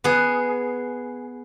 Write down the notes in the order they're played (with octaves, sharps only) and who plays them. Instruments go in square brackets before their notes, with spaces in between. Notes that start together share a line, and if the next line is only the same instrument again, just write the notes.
[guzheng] B3 G#4